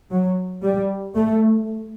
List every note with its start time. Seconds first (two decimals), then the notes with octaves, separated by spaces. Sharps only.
0.11 F#3
0.63 G3
1.15 A3